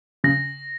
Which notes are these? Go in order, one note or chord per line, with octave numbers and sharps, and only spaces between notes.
C#3 A#6